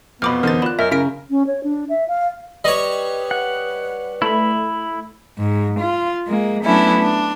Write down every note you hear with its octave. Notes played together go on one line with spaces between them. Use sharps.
F2 B2 B3 B5 D6 F6
E1 D3 D#4 A#4 C5 A6
F4 D5 B5 F#6 E7
F#2 A#4 C#5 D#5 E5
C#3 E4 A#4 B6 D7
C#4
C#5
D4
E5
F5
G3 B4 C#5 D#5
F#5
A3 E4 B5
G#2
F4
G#3 A#3
F#3 A3 B3 C#4 D4 E4
D4